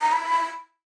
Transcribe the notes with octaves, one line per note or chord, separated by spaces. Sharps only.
A#5
B5